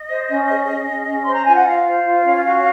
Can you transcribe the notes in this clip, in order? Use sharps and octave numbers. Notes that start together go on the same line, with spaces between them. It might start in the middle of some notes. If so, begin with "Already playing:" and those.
Already playing: D#5
C5
C#4
G#4
G#4
C#4
C#4
C5 C6
A#5
F4 G#5
F#5
F4 F5
C5
F4
C#4
F#4